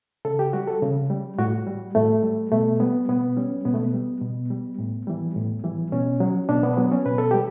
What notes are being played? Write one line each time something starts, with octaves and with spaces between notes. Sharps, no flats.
C#3 A4
G4
G3 F#4
A4
C#3
G3
A2 F#4
G3
A2 A3
G3
B2 A3
G3 B3
B2 B3
G3 C#4
B2 B3
A3
B3
G3
B2
G3
A2
E3 G3
A2
E3 G3
B2 C#4
F#3
B2 D4
B3
F#3 B3
C#4
B2 B4
A4
G3 G4